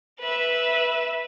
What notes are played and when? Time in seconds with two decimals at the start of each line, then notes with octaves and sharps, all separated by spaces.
0.20 B4 E5